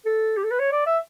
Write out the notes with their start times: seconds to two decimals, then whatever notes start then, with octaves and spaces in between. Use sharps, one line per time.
0.05 A4
0.37 G4
0.44 A4
0.51 B4
0.59 C#5
0.72 D5
0.86 E5